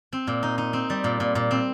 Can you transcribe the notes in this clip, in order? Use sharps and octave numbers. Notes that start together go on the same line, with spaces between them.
C4
A#2
D#4
D#4
C4
G3
A#2
A#2
A#2
C4